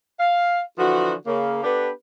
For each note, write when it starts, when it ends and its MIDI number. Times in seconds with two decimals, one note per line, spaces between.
0.20 0.61 77
0.78 1.14 50
0.78 1.14 52
0.78 1.14 53
0.78 1.14 66
1.26 1.60 49
1.26 1.60 58
1.63 1.90 59
1.63 1.90 62
1.63 1.90 67
1.63 1.90 69
1.63 1.90 71